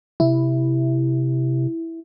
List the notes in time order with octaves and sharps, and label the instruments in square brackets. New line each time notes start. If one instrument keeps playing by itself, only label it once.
[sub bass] C3 [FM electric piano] E4